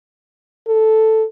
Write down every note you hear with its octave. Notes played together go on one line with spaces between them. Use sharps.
A4